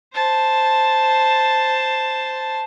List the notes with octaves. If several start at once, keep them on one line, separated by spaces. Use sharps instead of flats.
C5 A5